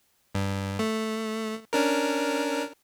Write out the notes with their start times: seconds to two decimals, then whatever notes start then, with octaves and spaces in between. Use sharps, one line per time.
0.35 G2
0.79 A3
1.73 C#4 D4 A#4